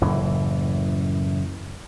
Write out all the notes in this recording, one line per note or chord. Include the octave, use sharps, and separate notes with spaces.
F#1 F#2 A2 E3